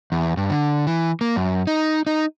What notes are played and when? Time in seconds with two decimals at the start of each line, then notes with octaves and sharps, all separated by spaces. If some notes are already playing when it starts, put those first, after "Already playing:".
0.12 E2
0.37 G2
0.50 D3
0.87 E3
1.21 A#3
1.36 F#2
1.67 D#4
2.07 D#4